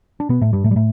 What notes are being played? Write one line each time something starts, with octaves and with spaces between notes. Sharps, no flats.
D4
B2 B3
A2 A3
G2 G3
A2 A3
G3
A2 A3